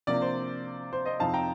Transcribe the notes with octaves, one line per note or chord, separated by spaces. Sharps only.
C3 F3 A#3 D4 D5
C5
C5
C5 D#5
F2 C3 F3 C4 D#4 F5 A5
G5 A#5